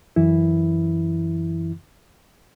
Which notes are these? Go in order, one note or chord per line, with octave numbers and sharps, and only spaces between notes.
F#2 E3 E4